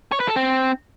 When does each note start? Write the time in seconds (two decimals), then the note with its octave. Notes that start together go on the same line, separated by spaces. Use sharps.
0.12 C#5
0.20 B4
0.28 A4
0.36 C4